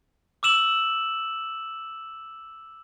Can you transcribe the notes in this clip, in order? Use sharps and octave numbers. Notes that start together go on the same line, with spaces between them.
D6 E6 E7 F#7